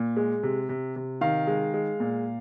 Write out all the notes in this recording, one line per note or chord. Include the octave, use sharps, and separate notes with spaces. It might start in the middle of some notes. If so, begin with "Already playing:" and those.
Already playing: A#2
G#3
C3
C3
C3
D#3 F5
G#3
G#3
A#2